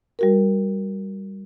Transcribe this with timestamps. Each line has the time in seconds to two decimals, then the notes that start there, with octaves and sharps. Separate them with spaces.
0.19 G3 F#4 A#4